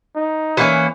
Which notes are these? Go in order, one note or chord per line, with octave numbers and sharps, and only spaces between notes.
D#4
E3 A#3 C#4